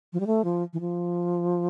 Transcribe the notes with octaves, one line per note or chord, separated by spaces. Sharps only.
F3
G3
A3
F3
E3
F3